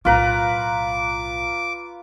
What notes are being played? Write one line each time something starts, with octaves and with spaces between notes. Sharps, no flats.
B1 A2 F4 B4 A#5 D6